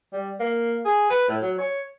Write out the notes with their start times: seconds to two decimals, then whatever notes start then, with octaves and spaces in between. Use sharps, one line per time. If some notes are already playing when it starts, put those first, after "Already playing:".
0.13 G3
0.40 A#3
0.85 G#4
1.10 B4
1.28 A2
1.41 F#3
1.58 C#5